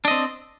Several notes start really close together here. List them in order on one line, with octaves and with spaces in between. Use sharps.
D4 D#5 C4